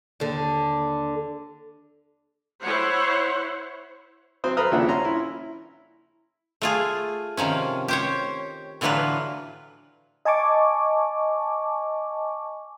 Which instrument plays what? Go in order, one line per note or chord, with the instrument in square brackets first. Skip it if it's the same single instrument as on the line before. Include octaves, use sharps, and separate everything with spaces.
[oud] D#2 D3
[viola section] E4 C5 C#5 F#5
[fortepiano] F#3 C4 C5 D#6
A4 B4 C5 A#5 D#6 F6
D#2 C#3 F3 D4 E5 F#5
C#4 A#5 C6
E4
[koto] A3 F4 G#4
C3 D#3 F3 C#4
G4 C5 C#5
A2 D3 E3 F#3 F4 B4
[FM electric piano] D#5 G#5 A5 C#6 D6